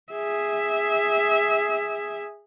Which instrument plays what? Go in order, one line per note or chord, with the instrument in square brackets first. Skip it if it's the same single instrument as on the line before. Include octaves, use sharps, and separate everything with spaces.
[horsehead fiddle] G#4 E5